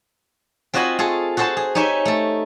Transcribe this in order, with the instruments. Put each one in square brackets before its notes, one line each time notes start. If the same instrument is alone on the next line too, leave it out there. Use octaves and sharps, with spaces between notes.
[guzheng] C4 F4 F#4 D#5 G#5 B5
F4 G#4 A4
F#4 G#4 A4 C5 A5
G#4
D#4 G4 C#5 E5 G#5
A3 A4